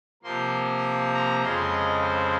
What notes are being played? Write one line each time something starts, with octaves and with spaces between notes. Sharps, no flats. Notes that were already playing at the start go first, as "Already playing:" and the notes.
C3 F3 A#3 C6
A#5
F2 C#3 G#3 C6
D#5
C5